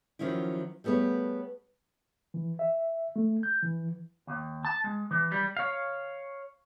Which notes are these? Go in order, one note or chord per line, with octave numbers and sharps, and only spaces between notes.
D#3 F3 F#3 C#4 E4
G3 A3 B3 G#4 C#5
E3
E5
A3
G6
E3
D#2
A5
G#3
E3
G3
C#5 F5